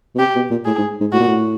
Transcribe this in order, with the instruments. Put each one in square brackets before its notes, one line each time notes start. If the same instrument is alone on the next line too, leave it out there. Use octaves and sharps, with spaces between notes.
[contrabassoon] B2
[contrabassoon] C3 [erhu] G4
[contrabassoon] B2
A#2
[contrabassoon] A2 [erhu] G#4
[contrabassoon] G#2
G#2
[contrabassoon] A2 [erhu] F#4
[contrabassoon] A#2
A2